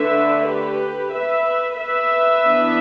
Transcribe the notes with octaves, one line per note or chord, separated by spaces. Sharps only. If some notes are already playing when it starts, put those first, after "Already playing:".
Already playing: D3 A3 D4 B4 E5
G4 B4
B4 E5
B4 E5
E3 B3 D4